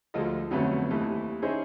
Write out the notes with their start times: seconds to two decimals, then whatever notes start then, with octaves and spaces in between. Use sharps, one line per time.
0.14 D2 F3 G#3 F4 A4 D#5
0.51 F2 D3 F#3 A3 B3 C#4
0.90 D#2 C3 E3 A3
1.42 C#4 D#4 E4 G#4 C5 C#5